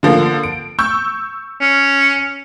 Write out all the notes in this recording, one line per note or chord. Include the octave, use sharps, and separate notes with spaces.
D3 F3 A#3
D7
C#6 E6 G6
C#4